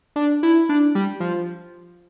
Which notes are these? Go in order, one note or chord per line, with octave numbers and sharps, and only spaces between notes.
D4
E4
D4
G3
F3